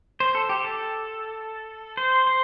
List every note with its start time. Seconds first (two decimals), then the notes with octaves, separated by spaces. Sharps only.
0.20 C5
0.35 A4
0.49 G4
0.64 A4
1.97 C5
2.27 C5